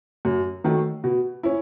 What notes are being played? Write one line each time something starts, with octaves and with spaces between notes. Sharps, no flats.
F#2
D#3 F#3 A3
B2
C#4 E4